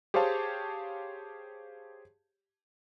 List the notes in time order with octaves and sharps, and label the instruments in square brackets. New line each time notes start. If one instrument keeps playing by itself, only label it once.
[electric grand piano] G4 G#4 C5 C#5 F5 A5